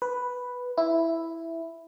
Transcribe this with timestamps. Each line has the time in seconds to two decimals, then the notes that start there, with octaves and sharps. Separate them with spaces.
0.02 B4
0.78 E4